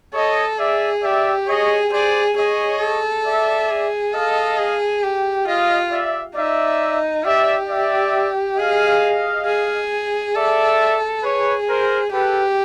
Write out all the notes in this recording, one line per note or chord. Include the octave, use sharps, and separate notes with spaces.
A4 C#5 D#5
G#4 D5 E5
G4 D5 E5
G#4 C#5 D#5
G#4 C5 D5
G#4 C#5 D#5
A4
D5 E5
G#4
A4 D#5 F5
G#4
G4
F4 D#5 F5
D5 E5
D#4 D5 E5
G4 D5 E5
D5 E5
G#4 D#5 F5
G#4
A4 D5 E5
G#4 B4 C#5
A#4 C5
G4 A4 B4